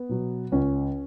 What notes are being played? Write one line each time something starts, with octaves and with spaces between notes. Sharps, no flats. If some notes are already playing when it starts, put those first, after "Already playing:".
Already playing: B3
B2 F#3
C#2 C#4